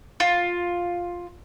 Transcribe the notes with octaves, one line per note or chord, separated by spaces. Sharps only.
F4